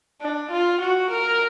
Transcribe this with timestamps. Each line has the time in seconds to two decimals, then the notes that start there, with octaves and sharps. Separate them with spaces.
0.21 D4
0.51 F4
0.80 F#4
1.10 A#4